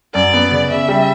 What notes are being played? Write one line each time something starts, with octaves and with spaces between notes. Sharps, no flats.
F#2 D5
B3
C#3
C#3 E5
G3